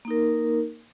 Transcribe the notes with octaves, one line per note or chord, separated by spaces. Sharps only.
A#3 D#4 A#4